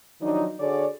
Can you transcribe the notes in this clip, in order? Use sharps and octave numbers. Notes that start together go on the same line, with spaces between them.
D#3 F3 F#3 D4 D#4
D3 F#4 G#4 C#5 D5